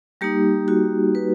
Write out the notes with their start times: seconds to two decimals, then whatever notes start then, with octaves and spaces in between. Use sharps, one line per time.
0.21 G3 A#3 D#4 G4
0.68 F#4
1.15 B4